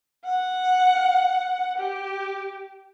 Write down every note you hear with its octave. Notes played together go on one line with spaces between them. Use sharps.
F#5
G4